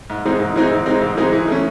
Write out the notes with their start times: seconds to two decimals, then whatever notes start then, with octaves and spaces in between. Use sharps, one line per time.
0.10 G#2
0.25 E3 G#3 C4 D#4
0.40 G#2
0.56 E3 G#3 C4 D#4
0.71 G#2
0.86 E3 G#3 C4 D#4
1.02 G#2
1.17 E3 G#3 C4 D#4
1.33 E3
1.48 A3 C#4